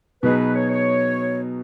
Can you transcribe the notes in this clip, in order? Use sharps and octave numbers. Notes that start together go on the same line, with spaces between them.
B2 F#3 B3 D#4 G#4 B4
C#5
C#5